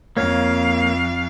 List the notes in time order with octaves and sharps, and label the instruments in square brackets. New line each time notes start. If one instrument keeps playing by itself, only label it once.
[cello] F2 F5 [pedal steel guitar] A#3 C#5 F6